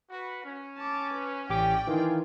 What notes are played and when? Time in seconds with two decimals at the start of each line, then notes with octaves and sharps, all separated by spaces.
0.10 F#4 B4
0.44 C#4
0.78 A5 D6
1.13 B4
1.50 A1 G4 D5 G5 D6
1.87 D#3 E3 F4 G#5